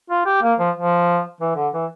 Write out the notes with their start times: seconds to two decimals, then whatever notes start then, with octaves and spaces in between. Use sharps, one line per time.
0.10 F4
0.26 G4
0.42 A#3
0.59 F3
0.75 F3
1.41 E3
1.56 D3
1.74 E3